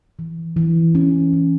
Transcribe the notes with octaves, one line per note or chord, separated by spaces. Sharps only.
E3
E3
C#4
E3